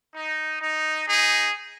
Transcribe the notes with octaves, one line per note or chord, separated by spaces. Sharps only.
D#4
D#4
D#4 G#4